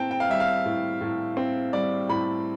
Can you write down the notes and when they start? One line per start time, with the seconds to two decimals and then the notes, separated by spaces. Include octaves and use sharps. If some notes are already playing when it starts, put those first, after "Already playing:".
Already playing: A2 C4 G5 A5
0.11 G5
0.20 F5
0.29 G3 E5
0.40 F5
0.66 A2
1.01 A2
1.37 C4
1.73 G3 D5
2.09 A2 B5